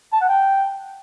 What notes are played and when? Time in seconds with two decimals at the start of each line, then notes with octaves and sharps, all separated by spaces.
0.13 A5
0.21 F#5
0.28 G5